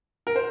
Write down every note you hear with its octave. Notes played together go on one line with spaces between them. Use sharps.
A#4
C5